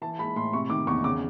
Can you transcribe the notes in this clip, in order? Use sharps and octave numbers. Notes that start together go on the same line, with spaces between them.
E3 A5
G#3 B5
A2 C6
C3 C#6
D#3 D6
E2 C#6
C#3 D6